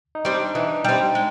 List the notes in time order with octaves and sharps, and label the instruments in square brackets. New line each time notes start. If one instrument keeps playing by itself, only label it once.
[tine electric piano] D#4
[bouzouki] G3 C4
[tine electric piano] D4
[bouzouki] E3 [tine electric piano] D#4
[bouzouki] G3 C4
G#3